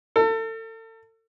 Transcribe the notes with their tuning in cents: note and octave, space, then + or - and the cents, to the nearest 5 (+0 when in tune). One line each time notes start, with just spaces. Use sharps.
A4 +35